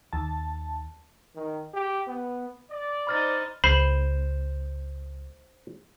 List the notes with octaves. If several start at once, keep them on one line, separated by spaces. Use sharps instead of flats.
D#2 A5
D#3
G4
B3
D5
D#4 C5 B5 F6 A6
C#2 C5 B5